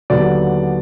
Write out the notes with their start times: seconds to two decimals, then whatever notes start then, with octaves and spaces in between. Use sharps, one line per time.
0.10 D#2 D3 F#3 B3 D5